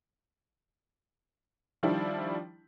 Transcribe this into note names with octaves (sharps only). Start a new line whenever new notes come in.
D#3 F3 G3 D4 E4